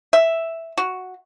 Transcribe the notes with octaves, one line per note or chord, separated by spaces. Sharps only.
E5
F#4